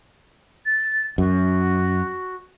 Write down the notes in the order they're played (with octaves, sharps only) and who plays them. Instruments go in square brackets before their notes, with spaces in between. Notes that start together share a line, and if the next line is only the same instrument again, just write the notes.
[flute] A6
[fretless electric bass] F#2 [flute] F#4